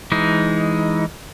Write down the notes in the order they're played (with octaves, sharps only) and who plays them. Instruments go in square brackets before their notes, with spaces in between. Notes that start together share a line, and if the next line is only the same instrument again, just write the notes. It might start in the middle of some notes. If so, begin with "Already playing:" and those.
[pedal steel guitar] E3 G#3 D#4